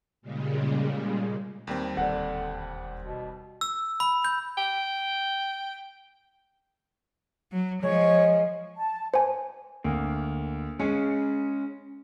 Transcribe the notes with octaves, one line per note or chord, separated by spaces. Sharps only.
A#2 C#3 G3 G#3
D#2 D#3 G3 C4
E1 D3 D5 F#5
B2
E6
B5
G6
G5
F#3
F3 G#3 C#5
A5
C5 G#5
D2 A#3
G#3 C#4 G#4 C#5